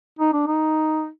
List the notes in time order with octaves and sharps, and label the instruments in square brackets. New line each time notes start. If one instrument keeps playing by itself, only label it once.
[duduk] D#4
D4
D#4